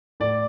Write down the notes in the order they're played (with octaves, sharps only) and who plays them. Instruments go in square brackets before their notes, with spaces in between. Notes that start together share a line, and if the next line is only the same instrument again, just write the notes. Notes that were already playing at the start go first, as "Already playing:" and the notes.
[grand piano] A2 D5